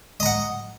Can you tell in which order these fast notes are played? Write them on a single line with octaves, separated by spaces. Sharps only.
D#5 A#5 F#5